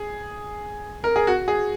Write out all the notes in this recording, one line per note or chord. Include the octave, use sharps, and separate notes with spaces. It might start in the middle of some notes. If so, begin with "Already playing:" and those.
Already playing: G#4
A#4
G#4
F#4
G#4